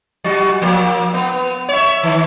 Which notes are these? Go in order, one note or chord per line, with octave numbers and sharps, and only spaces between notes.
F#3 F#4
F3 A#3
B3
C#5 E5
D#3